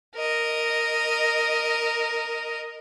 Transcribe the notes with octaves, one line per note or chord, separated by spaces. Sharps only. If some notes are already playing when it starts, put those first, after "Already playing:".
A#4 D#5